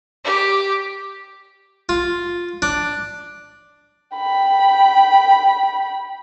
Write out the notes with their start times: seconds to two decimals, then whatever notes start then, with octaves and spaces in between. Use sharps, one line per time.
0.23 G4
1.89 F4
2.62 D4
4.17 G5 B5